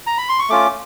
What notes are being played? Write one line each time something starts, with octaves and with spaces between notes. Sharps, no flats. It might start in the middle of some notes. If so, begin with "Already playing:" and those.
A#5
B5
C6
C#6
A3 C#4 F4 D6